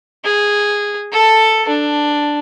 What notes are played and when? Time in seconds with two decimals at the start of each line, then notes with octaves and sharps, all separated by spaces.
0.25 G#4
1.12 A4 A5
1.68 D4